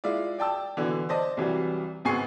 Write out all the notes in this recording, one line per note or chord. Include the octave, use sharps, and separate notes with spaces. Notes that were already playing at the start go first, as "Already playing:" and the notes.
G#3 E4 F4 D5
D5 G5 A5 E6
B2 D3 E3
C5 D5 D#5 A5
C2 E3 F#3 G3
G#1 C#2 B3 G#5 C#6 C7